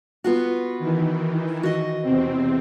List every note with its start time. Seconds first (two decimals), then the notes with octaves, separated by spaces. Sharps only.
0.24 B3 F4 F#4
0.79 D#3 E3
1.63 F#4 D#5
2.02 E2 C3 C4